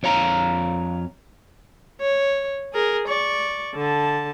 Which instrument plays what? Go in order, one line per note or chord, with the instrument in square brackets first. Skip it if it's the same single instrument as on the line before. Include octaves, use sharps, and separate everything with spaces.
[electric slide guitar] F2 C#5 F5 A#5
[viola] C#5
G#4 A#4
D5 C#6
D3 A5